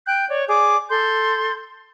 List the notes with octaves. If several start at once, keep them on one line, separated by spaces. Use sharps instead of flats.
G5 F#6 G6
C#5 D5
G#4 D5 D6
A4 C6 G6